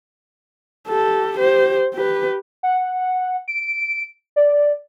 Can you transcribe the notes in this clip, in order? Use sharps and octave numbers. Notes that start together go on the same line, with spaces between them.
G4 A4
G4 C5
G4 B4
F#5
D7
D5